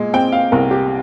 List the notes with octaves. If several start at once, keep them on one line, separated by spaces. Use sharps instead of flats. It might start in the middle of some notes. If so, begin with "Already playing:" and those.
Already playing: A#2 G#3
C4 G5
F5
C2 A#4
G4